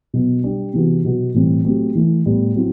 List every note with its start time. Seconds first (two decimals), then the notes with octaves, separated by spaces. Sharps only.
0.13 B2 F#3 B3
0.44 G3 D4 G4
0.74 C3 E3 B3 F#4
1.04 B2 F#3 B3 F#4
1.34 A2 E3 G3 C4
1.65 F#3 A3 C4 G4
1.95 E3 A3 E4
2.26 A2 G3 B3
2.55 F#3 C4 E4